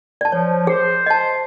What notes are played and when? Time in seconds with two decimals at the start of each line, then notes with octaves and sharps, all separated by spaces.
0.21 D5 A5
0.32 F3 C#5
0.67 G#4 C5
1.06 D#5 A5